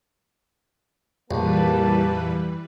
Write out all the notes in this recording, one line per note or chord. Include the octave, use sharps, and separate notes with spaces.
A#1 F2 E3 G3 A#3 G4 B4 A5